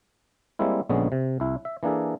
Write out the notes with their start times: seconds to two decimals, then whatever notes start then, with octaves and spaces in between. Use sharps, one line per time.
0.59 G3 G#3 A#3 C4 E4
0.89 A#1 D3 G#3 B3 C#4
1.12 C3
1.40 C2 E4
1.65 E5
1.83 E3 A#3 D4 G#4 A4